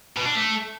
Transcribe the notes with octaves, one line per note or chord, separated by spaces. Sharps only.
B2
D4
A3